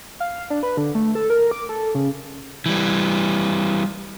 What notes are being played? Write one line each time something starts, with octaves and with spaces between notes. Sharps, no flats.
F5
D4
B4
D3
A3
A4
A#4
D6
A4
C#3
E3 G3